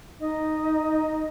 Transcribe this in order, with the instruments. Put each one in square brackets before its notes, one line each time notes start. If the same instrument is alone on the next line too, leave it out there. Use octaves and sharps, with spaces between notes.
[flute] D#4 [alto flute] D#5